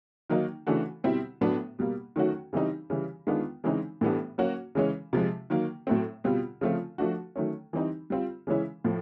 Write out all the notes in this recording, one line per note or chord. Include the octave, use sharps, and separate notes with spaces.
D#3 F#3 A#3 D#4
C#3 E3 A3 D4 F#4
B2 G3 C4 E4
A2 F#3 B3 D4
B2 G3 A#3
D#3 F#3 A3 C#4 F#4
C#3 E3 G3 C4 D#4
C#3 E3 G3
D#3 G#3 B3 D4 F4
C#3 E3 G#3 C4 D#4
A2 E3 G3 B3 D4
F#3 A#3 C#4 F#4
C#3 E3 G#3 C#4
C3 F3 G#3
D#3 F#3 A#3
A2 F#3 A3 C4
B2 G3 C4 F4
C#3 F3 A3 C4 F4
F3 A3 D4 F#4
D#3 F#3 A3 C#4
E3 G3 C4 D#4
G3 C4 F4
C#3 E3 G#3 C#4 E4
A2 F3